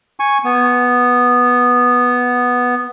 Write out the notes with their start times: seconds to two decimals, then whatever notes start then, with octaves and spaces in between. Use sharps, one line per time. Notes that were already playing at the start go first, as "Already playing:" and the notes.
0.20 G#5 C#6
0.44 B3